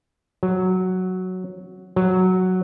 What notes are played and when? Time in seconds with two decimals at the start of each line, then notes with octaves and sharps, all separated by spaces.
0.43 F#3
1.96 F#3